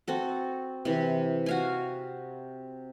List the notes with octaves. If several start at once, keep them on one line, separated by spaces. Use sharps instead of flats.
C4 F#4 A4
C3 E3
F#4 F5 G#5